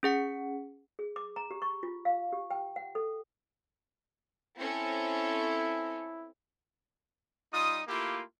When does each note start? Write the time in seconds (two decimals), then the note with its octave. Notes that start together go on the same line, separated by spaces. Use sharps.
0.03 C#4 G#4 F#5 C#7
0.99 G#4
1.16 D6
1.36 A#5
1.51 G4
1.62 C#6
1.83 F4
2.05 F5
2.33 G4
2.51 G5
2.76 F#5
2.95 A4
4.58 C4 C#4 E4 A4
7.52 G3 D#4 F4 D#6
7.87 A3 A#3 E4 F4 G4